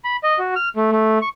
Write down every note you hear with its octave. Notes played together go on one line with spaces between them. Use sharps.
B5
D#5
F#4
F6
A3
A3
C#6